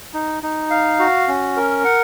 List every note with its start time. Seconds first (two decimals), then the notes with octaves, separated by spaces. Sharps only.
0.14 D#4
0.43 D#4
0.70 F5
0.99 F#4
1.28 C#4
1.56 A#4
1.84 F#5